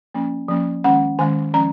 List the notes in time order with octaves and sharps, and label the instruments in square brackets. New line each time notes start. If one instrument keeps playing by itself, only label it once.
[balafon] F3 A#3 C#4
F3 A#3 C#4
D#3 G#3 C#4 F#5
D#3 G#3 C#4 G#5
F3 G#3 C#4 A#5